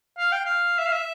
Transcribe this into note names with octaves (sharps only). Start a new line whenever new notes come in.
F5
G5
F5
E5
F5
E5